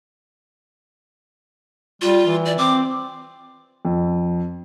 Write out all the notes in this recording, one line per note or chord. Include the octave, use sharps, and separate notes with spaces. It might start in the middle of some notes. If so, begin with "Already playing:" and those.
G3 F4
E3
D5
C4 D6
F2